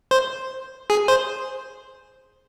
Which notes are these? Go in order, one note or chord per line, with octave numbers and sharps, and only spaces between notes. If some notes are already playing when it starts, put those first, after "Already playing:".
C5
G#4
C5